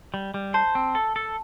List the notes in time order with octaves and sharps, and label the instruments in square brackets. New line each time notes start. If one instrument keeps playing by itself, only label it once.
[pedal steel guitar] G3
G3
[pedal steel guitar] C5 [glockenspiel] A5
[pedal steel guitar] C4
A4
A4